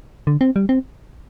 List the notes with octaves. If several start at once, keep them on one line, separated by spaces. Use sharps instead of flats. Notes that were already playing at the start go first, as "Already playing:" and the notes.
D3
C4
G3
C4